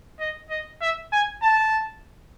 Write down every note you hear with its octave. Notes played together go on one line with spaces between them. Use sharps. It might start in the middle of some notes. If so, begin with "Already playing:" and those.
D#5
D#5
E5
G#5
A5